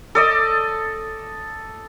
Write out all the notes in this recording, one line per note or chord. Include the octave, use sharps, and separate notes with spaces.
A4 D5 D#5